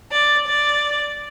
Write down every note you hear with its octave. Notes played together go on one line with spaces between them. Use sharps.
D5
D5